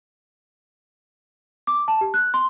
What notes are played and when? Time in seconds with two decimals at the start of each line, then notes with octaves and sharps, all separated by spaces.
1.67 D6
1.88 A5
2.01 G4
2.14 F#6
2.34 C6